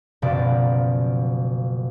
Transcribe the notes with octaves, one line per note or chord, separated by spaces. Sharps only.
F#1 B2 F3 D5